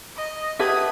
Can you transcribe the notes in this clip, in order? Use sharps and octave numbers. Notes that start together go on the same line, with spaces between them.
D#5
G4 B4 E5 F#5 A5 D#6 G#6